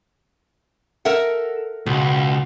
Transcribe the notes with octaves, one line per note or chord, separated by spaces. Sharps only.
A4 A#4 E5 F#5
C#2 B2